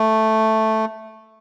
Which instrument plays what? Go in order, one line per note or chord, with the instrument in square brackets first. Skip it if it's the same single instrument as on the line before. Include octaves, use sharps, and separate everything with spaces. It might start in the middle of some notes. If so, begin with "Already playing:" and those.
Already playing: [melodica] A3